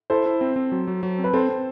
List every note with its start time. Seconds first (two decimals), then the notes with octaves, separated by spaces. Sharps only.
0.10 E4 A4 C5
0.26 E4
0.41 C4
0.56 C4
0.72 F#3
0.87 F#3
1.03 F#3
1.19 C4
1.24 B4
1.33 C4 A4 C5
1.49 C4